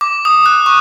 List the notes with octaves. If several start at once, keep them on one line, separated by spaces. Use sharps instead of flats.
D6
D#6
F#6
C#6